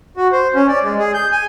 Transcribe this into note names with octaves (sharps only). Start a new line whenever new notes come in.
F#4
C5
C#4
D5
G#3
G#4
G6
G#5